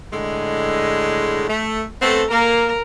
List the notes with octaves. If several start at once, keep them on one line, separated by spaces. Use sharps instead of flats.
A2 D3 G#3
A3
A3 B3 C4 A4
A#3 A#4